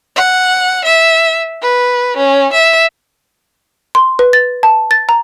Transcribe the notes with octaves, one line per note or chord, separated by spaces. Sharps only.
F#5
E5
B4
C#4
E5
C6
B4
A6
A5
A6
A#5